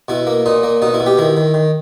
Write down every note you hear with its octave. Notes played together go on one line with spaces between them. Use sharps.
B2 E4
A#3
A#2 D#4
A#3
B2 D#4
E4
B2
G4
D#3 E4
D#3
D#3